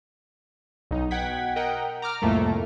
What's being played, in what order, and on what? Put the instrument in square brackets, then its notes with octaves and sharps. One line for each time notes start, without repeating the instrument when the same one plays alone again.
[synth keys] B1 D#4
B2 F#5 G5 G#6 B6
A#4 D#5 F#5 G5
A#5 D6 F6
C2 F2 A2 A3 A#3